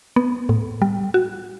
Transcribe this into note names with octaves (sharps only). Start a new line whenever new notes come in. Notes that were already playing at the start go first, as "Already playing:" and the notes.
B3
A2
G3
F#4